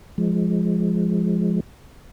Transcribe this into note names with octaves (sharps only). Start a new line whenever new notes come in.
F3 G#3